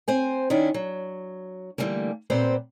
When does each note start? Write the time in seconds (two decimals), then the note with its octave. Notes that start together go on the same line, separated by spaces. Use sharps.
0.08 C4 C5 G#5
0.50 D#3 C#4 D4 E4
0.74 F#3
1.78 D3 E3 F#3 G3 A3 A#3
2.30 A#2 B3 C4 G4 C5